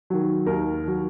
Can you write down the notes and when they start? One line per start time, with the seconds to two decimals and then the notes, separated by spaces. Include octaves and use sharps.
0.10 D#3 F#3
0.46 D#2 A#4
0.84 D#3 F#3